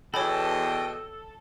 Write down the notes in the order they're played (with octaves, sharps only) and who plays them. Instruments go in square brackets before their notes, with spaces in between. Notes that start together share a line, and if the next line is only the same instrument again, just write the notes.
[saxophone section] E2 B2 D#5 [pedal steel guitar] A4 [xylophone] C#5 G#5 B5 [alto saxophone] G5